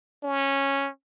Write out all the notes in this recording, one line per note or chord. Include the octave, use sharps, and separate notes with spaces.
C#4